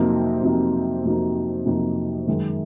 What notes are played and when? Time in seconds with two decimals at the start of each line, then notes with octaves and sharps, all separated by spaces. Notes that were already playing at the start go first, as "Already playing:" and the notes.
Already playing: F2 C3 F#3 A#3 D#4
0.43 F2 C3 F#3 A#3 D#4
1.05 F2 C3 F#3 A#3 D#4
1.66 F2 C3 F#3 A#3 D#4
2.27 F#2 D#3 G#3